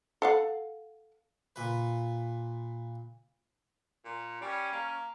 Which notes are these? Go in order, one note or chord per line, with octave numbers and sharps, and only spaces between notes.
A4 F5 F#5
A#2 B4
A#2
G3 C#4
A#3